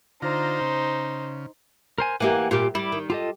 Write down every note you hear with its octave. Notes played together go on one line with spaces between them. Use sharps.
D3 D#4 F4 C5 A#5
C#3
A#4 C5 G#5
E3 A#3 G4 F#5 G#5 D6
A#2 G3 F4 G4 D6
G3 E4 D6
D#3
F4 G4 A4 D#5